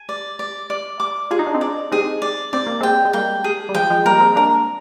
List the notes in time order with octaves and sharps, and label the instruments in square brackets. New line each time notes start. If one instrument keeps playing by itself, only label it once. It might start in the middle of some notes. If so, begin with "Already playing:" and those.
Already playing: [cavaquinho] G#5
D5
D5
D5
D6
[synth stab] F4 [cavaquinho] G#4
[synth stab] D#4
D4
C4 D#4
[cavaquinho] D5
[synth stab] C4 D#4 [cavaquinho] G#4
[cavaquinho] D5
[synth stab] C4 [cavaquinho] D5
[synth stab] A#3
[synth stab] G#3 C4 [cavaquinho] G5
[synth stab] G#3
[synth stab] G3 A#3 [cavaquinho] G5
[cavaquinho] G#4
[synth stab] G3
[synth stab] F3 G#3 [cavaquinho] G5
[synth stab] F3 G#3
[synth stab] G3 A#3 [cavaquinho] A#4
[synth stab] G#3 C4
[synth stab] A#3 D4 [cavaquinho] A#4